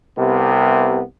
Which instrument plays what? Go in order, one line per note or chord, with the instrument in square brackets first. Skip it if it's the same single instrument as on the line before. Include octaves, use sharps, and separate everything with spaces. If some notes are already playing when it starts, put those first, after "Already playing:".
[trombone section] C2 C3 B3